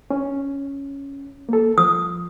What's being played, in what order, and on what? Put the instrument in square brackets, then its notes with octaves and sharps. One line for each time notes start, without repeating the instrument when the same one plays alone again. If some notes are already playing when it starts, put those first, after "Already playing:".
[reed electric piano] C#4
A#3 A4
[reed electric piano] F3 [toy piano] D#6